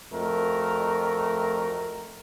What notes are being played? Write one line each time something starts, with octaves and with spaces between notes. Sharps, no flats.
F2 A3 F#4 A#4